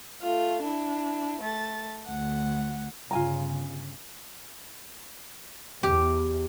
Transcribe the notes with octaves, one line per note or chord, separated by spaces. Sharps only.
A3 F4
D4 E4
A3 A6
D2 F#5
G1 G2 C#3 F4 G#5 A#5
E2 G4